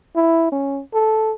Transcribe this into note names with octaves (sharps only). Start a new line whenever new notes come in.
E4
C#4
A4